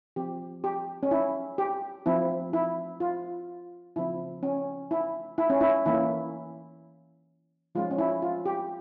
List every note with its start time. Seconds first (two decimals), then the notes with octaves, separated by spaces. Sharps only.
0.16 F3 C4 G4
0.64 G4
1.03 C#4
1.11 E4
1.58 G4
2.06 F3 C4 E4
2.53 E4
3.00 F4
3.96 C#3 F3 C4 E4
4.43 C#4
4.91 E4
5.38 E4
5.50 C#4
5.61 E4
5.86 E3 A#3 C#4 E4
7.75 F3 G#3 C#4 F4
7.91 C#4
7.98 E4
8.22 F4
8.46 G4